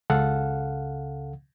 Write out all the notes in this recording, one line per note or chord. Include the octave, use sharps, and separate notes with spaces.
C#2 C#3 A4 F5 F#5